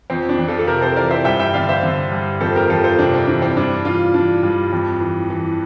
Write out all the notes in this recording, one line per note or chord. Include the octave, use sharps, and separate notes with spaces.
F2 C4
D4
F2
F4 A4
A4
C3 G4 A#4
A4 C5
E3 A#4 D5
C5 E5
G2 E5 G5
E5 G5
D3 D5 F5
C5 E5
D3
G2
F2 A4 C5
G4 A#4
F2 F4 A4
A4 C5
C3 D4
C4
E3 D4
C4
G2 D4
E3 D4 F4
E3 D4
G2
F2
E3
E3